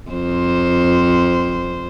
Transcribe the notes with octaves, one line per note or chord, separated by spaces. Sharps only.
F2 C5